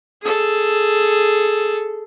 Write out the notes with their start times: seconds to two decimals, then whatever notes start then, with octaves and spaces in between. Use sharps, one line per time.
0.22 G#4 A4